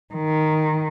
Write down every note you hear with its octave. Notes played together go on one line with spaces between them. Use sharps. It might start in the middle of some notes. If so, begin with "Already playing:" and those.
D#3